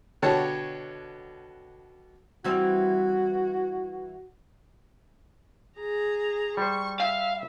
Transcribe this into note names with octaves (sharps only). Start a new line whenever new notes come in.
B2 D3 G4 C#5 F#5 A5
E3 G3 C4 F#4
G#4 A#5
G3 C5 C#6
E5 F5